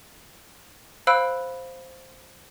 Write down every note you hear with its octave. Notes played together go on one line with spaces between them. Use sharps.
C5 F5 B5 E6 F#6 D7